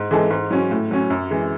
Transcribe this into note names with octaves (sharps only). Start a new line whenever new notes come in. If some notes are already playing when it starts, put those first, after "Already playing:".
Already playing: G#2
E3 G#3 D#4 A4
G#2
F#3 C#4
A2
F#3 C#4
F#2
E3 G#3